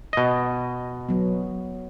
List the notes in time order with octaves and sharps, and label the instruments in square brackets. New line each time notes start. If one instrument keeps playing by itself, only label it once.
[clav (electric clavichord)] B2 D#5
[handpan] F#3 B3